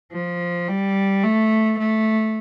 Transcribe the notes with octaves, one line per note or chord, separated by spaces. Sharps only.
F3
G3
A3
A3